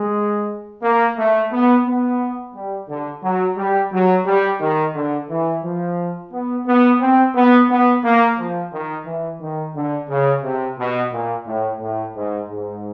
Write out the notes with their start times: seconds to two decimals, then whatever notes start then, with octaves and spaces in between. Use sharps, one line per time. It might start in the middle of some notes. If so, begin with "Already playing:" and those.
Already playing: G#3
0.83 A#3
1.17 A3
1.52 B3
1.87 B3
2.55 G3
2.89 D3
3.23 F#3
3.57 G3
3.92 F#3
4.26 G3
4.61 D#3
4.94 D3
5.29 E3
5.64 F3
6.32 B3
6.66 B3
7.00 C4
7.35 B3
7.70 B3
8.04 A#3
8.38 F3
8.73 D#3
9.06 E3
9.40 D#3
9.75 D3
10.09 C#3
10.43 C3
10.79 B2
11.12 A#2
11.47 A2
11.80 A2
12.16 G#2
12.50 G#2